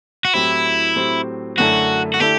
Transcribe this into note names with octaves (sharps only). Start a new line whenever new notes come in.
F#4
A2 F#3 C4 E4 G4 C5
A2 F#3 C4 G4 C5
F#2 D3 A3 E4 F#4 A4
F#4
D3 A3 E4 G4 A4